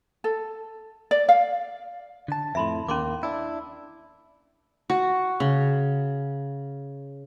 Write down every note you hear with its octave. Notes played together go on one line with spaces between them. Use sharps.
A4
D5
F5
D3 A5
F2 A2 E5 B5 C6
D#2 A#3 C#4 C6 D6
D4 E4
F#4
C#3